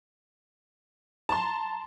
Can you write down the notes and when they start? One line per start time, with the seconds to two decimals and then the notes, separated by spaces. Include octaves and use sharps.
1.29 A5 A#5 C6